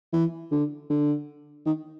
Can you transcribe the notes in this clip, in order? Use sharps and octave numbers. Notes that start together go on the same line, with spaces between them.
E3
D3
D3
D#3